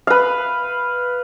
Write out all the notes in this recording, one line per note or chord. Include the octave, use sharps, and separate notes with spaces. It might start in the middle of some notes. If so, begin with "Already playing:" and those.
B4 F5